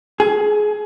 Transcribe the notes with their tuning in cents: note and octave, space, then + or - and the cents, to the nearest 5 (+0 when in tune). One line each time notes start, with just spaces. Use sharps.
G#4 +20